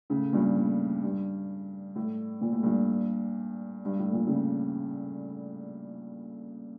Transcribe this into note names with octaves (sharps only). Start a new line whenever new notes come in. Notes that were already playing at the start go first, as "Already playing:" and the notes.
A2 C#3
G2 A#2
A2
G2
A2
A#2
A2
G2 A#2
G2
A2
A#2
A2 C#3